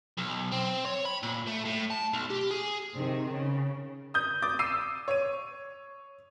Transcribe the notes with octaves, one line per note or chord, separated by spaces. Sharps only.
B1
C4
C#5
B5
A#2
A3
A2
A5
B1
G4
G#4
C3 D#3
C#3
D#6 G6
D6 D#6 A6
D6 E6 C7 D#7
C#5 D#7